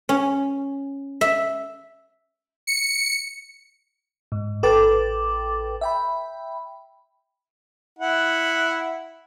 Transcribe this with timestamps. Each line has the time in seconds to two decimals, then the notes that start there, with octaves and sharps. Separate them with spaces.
0.09 C#4
1.21 E5
2.67 C#7
4.32 G#2
4.63 A1 A4 B4 G5 D6 A6
5.81 E5 G5 B5
7.99 E4 F#5